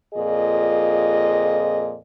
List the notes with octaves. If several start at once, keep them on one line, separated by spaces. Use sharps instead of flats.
F2 A#2 G#4 D#5